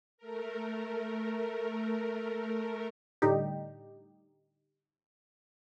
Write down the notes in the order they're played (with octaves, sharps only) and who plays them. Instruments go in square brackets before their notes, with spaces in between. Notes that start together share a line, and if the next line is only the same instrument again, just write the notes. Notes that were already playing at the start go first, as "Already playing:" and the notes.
[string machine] A3 A#4
[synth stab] A2 D3 G3 D#4 G4